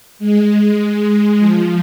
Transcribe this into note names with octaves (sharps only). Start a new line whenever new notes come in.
G#3
F3